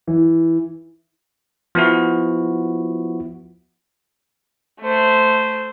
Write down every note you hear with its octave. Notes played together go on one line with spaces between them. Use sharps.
E3
F3 B3 E4 F#4
A3 C5